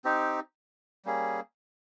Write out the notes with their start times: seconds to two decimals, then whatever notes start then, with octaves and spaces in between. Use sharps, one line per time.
0.04 C4 D#4 G4
1.05 G3 A#3 C#4 G#4